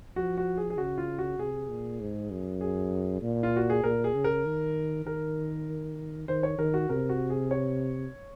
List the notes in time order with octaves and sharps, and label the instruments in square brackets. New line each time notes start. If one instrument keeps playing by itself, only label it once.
[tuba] F3 [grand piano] F#4
[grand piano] F#4
G#4
G#4
[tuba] C#3 [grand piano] F#4
[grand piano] F4
F#4
[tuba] C3 [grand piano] G#4
[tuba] A#2
G#2
F#2
[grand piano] G#4
[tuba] A#2
[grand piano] F4
F#4
G#4
[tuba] A#2 [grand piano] A#4
[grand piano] G#4
[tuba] C#3
[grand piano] A#4
[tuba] D#3
[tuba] D#3 [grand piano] A#4
[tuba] D#3 [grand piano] C5
[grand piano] C#5
[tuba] D#3 [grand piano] A#4
[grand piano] F#4
[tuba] C3 [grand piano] A#4
[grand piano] F#4
G#4
C#5